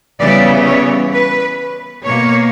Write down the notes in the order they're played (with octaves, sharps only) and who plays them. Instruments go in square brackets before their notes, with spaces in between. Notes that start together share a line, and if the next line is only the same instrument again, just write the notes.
[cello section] C#3 E3 G3 B3 D5
C#5
B4
B2 A#3 C#5